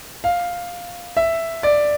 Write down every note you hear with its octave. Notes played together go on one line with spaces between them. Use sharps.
F5
E5
D5